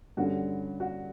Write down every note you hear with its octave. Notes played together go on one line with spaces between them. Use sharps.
G2 D3 A3 C#4 F#4
F#4